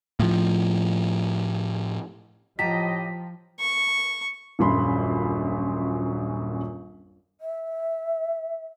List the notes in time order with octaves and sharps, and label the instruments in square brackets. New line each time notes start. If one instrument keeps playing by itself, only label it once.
[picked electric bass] A2 F3
[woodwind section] A2 G4 D#5 [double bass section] F3 [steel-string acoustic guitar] G5 A5 A#5 [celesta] B6
[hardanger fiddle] C#6
[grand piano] D#1 A#1 F#2 B5 C6
[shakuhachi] E5